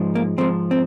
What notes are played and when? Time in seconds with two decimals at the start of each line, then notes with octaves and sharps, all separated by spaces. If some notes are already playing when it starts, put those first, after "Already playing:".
Already playing: G#2 F3 G#3
0.15 A#3
0.38 G#2 F3 G#3 C4
0.71 C4